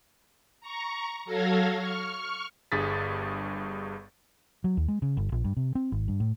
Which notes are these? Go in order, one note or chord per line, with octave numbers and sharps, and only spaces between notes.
A#5 C#6
F#3 A4 F5 G#6 A#6
C#6 F6
G1 G2 G#4 D#6 A6 B6
F#3
D#2
G#3
C#3
G1
A#1
G2
C3
C4
G#1
G2
A2